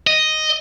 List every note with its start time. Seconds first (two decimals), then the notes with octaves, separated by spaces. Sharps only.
0.07 D#5